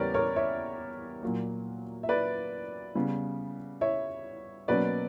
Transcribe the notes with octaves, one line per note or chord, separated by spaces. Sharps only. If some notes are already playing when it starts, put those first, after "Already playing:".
Already playing: E2 C#3 G3 G4 A#4 B4 C#5 D5
A#4 C#5
C#5 E5
A#2 F#3 A#3
E5
B4 D5
C#3 G3 B3
C#5 E5
B2 F#3 A#3 C#4 B4 D5